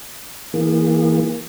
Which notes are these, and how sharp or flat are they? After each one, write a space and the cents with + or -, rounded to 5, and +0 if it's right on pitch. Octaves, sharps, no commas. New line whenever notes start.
E3 -20 A#3 +0 G#4 -25